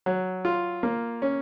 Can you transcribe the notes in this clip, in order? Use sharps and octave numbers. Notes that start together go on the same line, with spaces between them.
F#3
F4
A#3
C#4